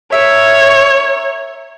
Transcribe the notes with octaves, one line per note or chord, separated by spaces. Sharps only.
A#4 C#5 E5